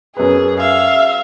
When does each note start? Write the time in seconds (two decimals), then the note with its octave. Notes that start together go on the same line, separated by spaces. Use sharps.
0.17 F#2 G#4 B4
0.60 E5 F5